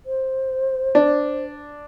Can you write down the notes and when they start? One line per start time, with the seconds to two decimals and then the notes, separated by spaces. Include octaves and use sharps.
0.06 C5
0.95 D4